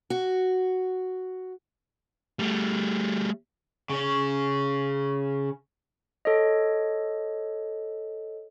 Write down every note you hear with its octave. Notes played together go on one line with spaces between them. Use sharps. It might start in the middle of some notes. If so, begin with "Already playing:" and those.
F#4
G3 A3
C#3 C#4
A4 C#5 D#5